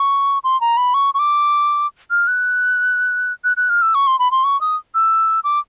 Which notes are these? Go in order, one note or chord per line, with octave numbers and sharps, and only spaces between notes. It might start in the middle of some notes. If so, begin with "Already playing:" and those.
Already playing: C#6
C6
A#5
B5
C#6
C#6
D6
F6
F#6
F#6
F#6
F6
E6
C#6
C6
B5
C6
C#6
D#6
E6
D6